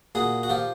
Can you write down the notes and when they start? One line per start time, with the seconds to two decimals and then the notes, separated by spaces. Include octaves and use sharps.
0.15 A#2 F#4 G#4
0.43 F#4
0.49 F3 F4 G4